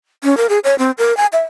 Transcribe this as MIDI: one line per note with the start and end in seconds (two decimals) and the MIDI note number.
0.24 0.37 61
0.37 0.47 70
0.49 0.59 68
0.64 0.75 73
0.79 0.91 60
0.98 1.16 70
1.17 1.26 80
1.32 1.42 76